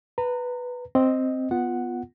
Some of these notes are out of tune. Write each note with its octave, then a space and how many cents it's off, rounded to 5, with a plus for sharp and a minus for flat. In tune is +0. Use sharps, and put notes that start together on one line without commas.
B4 +0 A#5 -30
C4 +0 D#5 +0
B3 +0 F4 +0 F#5 +0